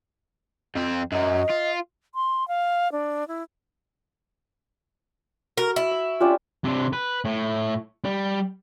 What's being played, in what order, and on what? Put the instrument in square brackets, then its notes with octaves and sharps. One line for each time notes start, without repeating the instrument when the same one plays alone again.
[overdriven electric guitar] F2 C4
[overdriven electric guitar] F#2 F#3 [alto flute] D#5
[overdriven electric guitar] F4
[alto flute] C6
F5
D4
E4
[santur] F#4 [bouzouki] A#4
[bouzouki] E4
[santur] E5
[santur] C#4 D4 G4 [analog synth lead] F4
[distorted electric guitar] C3 D4
B4
A2
G3